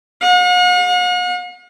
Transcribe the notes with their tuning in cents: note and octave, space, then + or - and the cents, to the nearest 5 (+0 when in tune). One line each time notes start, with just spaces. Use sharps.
F#5 -45